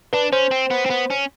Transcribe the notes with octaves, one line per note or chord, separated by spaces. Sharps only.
D4 B4
C#4 C5
C4
B3
C4
B3
C#4